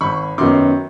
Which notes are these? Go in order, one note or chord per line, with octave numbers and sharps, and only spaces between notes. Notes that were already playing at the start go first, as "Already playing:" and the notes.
G#1 B5 C#6
F#2 D#3 F#3 B3 C6 D6